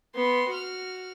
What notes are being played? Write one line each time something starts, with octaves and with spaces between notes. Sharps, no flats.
B3 C6
F#4 F6